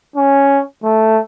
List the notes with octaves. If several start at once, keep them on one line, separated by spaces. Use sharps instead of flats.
C#4
A3